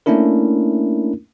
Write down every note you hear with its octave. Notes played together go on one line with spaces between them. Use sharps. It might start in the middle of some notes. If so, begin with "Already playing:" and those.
A3 A#3 C#4 D4 E4 A#4